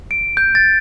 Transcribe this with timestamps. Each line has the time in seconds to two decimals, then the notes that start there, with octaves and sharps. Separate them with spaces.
0.11 D7
0.37 G6
0.55 A6